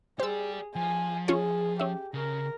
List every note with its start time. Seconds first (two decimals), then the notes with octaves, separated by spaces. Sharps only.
0.20 G4 G#4 C5 D5 E6
0.76 F3 G#5
1.28 C#4 F4 G#4 C#5
1.79 C#4 G4 E5
2.14 C#3 A#4